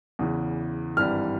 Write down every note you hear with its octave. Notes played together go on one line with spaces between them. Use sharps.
E2 C#3 E3
G#1 G2 E3 G3 F6